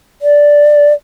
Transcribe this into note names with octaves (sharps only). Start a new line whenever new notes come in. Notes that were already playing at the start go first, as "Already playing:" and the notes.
D5